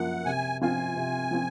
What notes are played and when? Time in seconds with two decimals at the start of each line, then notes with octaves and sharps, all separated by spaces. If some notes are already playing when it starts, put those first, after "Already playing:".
Already playing: F#2 F3 A#3 F#5
0.26 C3 G#5
0.61 F3 C4 F4 G#5
0.96 C3
1.31 F3 C4 F4